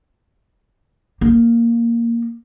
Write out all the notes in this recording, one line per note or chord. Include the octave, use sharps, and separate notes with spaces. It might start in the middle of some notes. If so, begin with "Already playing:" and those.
A#3